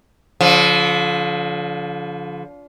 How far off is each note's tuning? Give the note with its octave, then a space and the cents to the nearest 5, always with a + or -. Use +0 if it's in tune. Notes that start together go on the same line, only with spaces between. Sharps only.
D3 -35 F3 +15